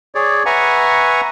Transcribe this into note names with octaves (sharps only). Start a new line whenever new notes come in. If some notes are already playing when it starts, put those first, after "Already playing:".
G#4 C#5 D5
B4 E5 F#5 G#5 A#5 C#6